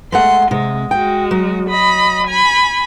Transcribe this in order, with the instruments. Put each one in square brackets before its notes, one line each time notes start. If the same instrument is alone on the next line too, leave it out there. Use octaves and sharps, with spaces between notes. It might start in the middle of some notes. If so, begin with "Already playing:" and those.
[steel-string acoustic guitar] G#3 A3 F#5 [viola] C6
[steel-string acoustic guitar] C3 [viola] G#3
[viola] G#3 F#4 [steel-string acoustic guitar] G5
[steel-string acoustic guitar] F#3
[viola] D#5 B5
G#5 B5